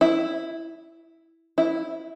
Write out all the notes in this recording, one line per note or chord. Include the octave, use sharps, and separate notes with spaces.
E4
E4